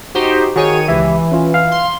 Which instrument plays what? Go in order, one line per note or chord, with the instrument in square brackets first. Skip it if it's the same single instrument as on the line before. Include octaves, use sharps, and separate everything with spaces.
[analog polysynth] D#4 G4 C5 [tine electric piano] F#4
[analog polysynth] D#3 C#5 D#7 [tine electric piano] F#4 G#4
[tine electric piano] C#2 G4 E5 [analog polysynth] E3
[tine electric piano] C#4 F4
F5 F6
[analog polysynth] C6